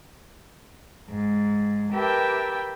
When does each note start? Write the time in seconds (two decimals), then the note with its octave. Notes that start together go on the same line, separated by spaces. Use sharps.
1.09 G#2
1.94 G4 A#4 B4 E5 G5 A5